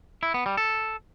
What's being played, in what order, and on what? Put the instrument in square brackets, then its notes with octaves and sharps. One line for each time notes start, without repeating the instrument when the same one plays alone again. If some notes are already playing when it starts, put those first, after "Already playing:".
[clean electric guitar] E4
B3
G3
A4